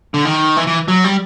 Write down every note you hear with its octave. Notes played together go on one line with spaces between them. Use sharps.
D3
D#3
E3
E3
F#3
G3